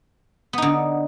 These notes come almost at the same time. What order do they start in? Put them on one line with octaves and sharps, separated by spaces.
B3 D#4 D3